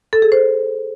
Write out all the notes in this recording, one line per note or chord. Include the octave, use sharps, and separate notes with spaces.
A4
G#4
C5